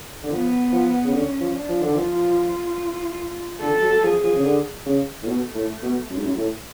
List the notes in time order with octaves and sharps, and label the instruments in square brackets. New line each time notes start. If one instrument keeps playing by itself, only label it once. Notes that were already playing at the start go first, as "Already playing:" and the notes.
[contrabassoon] D3
[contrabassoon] F3 [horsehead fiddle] B3
[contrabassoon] F3
C#3
[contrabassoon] D3 [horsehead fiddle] C#4
[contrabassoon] F3
[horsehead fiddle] D4
[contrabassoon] F3
D3
[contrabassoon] F3 [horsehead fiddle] F4
[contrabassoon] D3 [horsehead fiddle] A4
[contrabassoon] F#3
[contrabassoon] F3 [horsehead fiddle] G#4
[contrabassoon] F3
C#3
D3
C#3
A2
[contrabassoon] B2 [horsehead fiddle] A3
[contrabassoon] A2
B2
F#2
G#2
F#2
A2